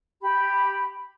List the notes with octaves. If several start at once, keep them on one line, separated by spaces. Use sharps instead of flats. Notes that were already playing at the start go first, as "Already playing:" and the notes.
G4 B5